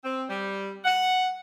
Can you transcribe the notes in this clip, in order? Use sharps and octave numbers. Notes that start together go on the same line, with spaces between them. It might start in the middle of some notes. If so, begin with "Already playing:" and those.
C4
G3
F#5